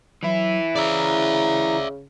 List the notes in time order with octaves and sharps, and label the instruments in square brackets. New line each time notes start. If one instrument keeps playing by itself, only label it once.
[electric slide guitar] E3 E4 [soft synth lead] F#3
[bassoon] C#3 [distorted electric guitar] D5 E5 [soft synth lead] A#5